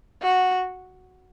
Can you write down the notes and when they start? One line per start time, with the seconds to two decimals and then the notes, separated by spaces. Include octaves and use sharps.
0.22 F#4